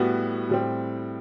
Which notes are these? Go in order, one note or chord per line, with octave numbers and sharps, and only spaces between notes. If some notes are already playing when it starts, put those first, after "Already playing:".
Already playing: A2 G3 B3 F#4
A2 G3 C4